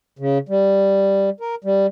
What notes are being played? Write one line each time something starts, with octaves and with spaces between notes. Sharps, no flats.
C#3
G3
A#4
G3